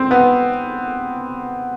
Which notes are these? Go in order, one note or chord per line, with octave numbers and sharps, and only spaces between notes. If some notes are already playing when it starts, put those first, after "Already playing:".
Already playing: C4
B3